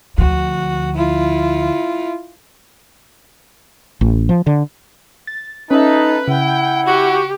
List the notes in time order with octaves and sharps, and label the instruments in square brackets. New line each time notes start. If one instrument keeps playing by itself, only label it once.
[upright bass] D2 F3 [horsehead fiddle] F#4
[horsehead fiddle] E4 F4
[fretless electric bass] A1
F3
D3
[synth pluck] A6
[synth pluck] C#4 E5 [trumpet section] D#4 [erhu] A4 [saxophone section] B4
[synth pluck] C#3 [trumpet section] E4 F#5 [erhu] G5
[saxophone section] F#4 [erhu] G4